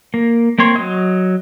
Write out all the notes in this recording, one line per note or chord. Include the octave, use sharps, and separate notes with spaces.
A#3
A#3 C4 C#5 C6
F#3 D#5